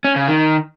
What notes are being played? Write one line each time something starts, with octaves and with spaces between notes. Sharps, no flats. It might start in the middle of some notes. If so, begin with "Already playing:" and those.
C#4
C#3
D#3